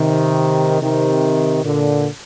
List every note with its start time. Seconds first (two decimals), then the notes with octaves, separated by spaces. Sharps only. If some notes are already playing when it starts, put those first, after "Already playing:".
Already playing: C3 D#3
0.81 C3 D#3
1.63 A#2 D3